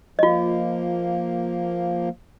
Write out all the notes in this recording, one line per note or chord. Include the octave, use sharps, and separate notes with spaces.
F3 A#3 F4 D#5